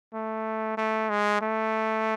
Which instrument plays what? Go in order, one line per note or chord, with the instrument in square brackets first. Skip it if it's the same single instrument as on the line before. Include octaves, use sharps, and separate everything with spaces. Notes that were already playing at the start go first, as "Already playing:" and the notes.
[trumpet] A3
A3
G#3
A3